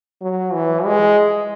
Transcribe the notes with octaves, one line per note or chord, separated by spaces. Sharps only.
F#3
E3
G#3